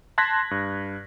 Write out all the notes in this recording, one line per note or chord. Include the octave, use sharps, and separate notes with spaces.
A5 C6 F#6 G#6 A#6 B6
G2